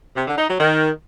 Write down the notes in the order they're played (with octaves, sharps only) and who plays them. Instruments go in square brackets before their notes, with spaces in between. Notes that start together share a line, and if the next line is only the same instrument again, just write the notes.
[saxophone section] C3
D3
D#4
F#3
D#3